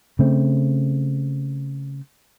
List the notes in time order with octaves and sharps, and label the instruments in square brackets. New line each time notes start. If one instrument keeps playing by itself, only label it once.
[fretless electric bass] C#3 A3 C4